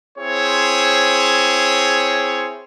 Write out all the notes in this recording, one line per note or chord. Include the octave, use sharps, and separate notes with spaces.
C4 E4 G#4 C5 C#5